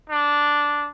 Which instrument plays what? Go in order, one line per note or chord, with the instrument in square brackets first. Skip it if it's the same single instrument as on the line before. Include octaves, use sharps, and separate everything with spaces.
[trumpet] D4